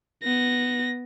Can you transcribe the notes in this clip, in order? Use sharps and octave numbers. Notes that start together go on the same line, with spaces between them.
B3 A#6